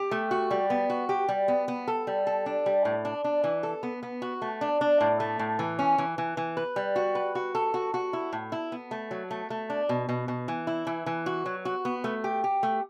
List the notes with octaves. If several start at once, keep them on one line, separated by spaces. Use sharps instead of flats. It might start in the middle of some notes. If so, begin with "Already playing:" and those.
Already playing: G4
A3
F#4
G3
B3
F#4
G4
G3
B3
B3
A4
G3
A4
D4
G3
A2
D4
D4
E3
A4
B3
B3
F#4
A3
D4
D4
A2
A3
A2
E3
C#4
E3
E3
E3
B4
G3
F#4
B4
F#4
A4
F#4
F#4
E4
A2
E4
B3
A3
F#3
A3
A3
D4
B2
B2
B2
E3
E4
E3
E3
F#4
F#3
F#4
B3
A3
G4
G4
A3